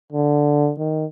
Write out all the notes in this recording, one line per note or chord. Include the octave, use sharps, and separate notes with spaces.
D3
D#3